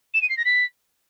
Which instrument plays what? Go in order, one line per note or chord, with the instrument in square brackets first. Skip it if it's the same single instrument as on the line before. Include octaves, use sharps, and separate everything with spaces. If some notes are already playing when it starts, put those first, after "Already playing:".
[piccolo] E7
D#7
C7
A#6
B6